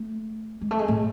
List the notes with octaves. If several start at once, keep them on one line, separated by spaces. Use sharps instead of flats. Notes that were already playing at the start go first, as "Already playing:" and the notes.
Already playing: A3
G#3
A3
G#3
A2